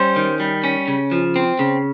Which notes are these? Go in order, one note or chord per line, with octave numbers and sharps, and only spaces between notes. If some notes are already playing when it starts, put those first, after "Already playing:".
Already playing: G3 C#4 C5
D#3
G3
C#4
C#3
F3
C4
C#3